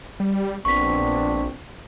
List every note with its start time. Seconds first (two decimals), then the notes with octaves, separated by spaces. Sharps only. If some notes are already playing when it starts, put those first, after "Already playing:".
0.20 G3
0.65 A#1 B3 C4 D4 C#6 B6